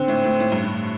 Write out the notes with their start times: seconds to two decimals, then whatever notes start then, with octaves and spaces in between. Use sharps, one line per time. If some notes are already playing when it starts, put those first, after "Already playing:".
Already playing: D3 C4
0.08 A2
0.24 A2
0.40 A2
0.52 G2
0.64 A2